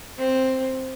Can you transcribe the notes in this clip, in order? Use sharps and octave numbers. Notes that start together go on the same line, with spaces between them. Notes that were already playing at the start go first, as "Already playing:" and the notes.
C4